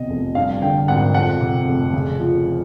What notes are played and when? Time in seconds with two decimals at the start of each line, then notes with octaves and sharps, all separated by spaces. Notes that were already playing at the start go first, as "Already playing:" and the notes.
Already playing: B1 E2 C3 D#5
0.09 F1
0.35 G2 F5
0.62 D3 G5
0.88 G#1 F#5
1.14 F2 F#5
1.40 C3
1.67 F1
1.93 C#3
2.20 F3